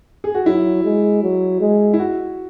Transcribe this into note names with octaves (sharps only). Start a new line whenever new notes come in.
G#4
F#4
F#3 E4
G#3
F#3
G#3
E4
F#4